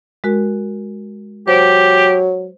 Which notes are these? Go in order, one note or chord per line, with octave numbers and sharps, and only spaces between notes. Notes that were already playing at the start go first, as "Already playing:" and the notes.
G#3 F#4 A#4
F#3 G4 C5